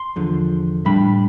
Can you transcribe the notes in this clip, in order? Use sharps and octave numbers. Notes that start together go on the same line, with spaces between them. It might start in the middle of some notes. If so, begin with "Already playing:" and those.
Already playing: C6
E2 D3 F3
A2 G3 D4 B5